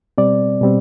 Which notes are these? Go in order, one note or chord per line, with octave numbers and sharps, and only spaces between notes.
B2 G3 C4 D5
B2 G3 C4